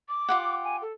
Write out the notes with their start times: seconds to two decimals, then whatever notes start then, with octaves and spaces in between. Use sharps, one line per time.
0.09 D6
0.29 F4 G4 F#5
0.64 G#5
0.82 A4